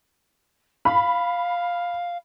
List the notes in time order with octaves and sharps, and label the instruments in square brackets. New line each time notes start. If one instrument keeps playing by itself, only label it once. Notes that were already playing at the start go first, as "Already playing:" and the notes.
[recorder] F5 [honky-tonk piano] B5